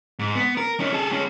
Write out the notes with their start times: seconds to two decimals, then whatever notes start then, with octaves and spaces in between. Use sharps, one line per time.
0.19 G#2
0.35 B3
0.57 A#4
0.80 C#4 D#4
0.92 G#4 A4
1.11 G#3 C#4